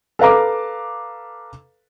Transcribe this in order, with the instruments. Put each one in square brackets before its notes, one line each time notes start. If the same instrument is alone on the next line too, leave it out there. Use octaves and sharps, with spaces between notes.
[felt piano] A4 B4 F5 A#5 D6